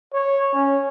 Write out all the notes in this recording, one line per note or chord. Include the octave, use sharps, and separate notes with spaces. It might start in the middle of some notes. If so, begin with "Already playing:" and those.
C#5
C#4